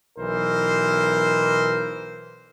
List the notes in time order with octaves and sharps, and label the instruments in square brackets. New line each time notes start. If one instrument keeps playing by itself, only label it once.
[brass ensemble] B1 E3 A#4 C5